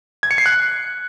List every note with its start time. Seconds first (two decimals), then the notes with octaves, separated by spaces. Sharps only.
0.23 G#6
0.31 C#7
0.38 C7
0.46 F#6